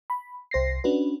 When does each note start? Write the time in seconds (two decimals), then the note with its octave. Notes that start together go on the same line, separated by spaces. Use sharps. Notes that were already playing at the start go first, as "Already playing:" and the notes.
0.10 B5
0.51 C2 C5 A#6 C7
0.84 C#4 D4 F#4 B4